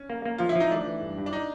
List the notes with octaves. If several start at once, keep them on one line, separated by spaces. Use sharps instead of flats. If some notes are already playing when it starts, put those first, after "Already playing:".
Already playing: C#4
A#3
A#3
F3 F4
E4
F3 D#4
A3 D4
E3
G2
G2
D4
D#4